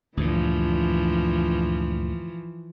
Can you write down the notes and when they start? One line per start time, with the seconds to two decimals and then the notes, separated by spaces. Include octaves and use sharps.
0.17 D2 G2 A#2 E3 F3